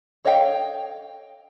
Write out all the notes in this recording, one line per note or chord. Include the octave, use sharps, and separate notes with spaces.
A4 C#5 D#5 F5 G5